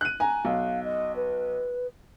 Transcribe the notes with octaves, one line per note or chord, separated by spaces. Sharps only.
F#6 D#7
G#5 A#5
B1 F5
D#5
B4